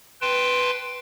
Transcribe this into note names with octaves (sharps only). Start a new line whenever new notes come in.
B4 G5 A5 C6